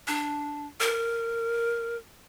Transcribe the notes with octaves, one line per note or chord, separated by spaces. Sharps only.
D4
A#4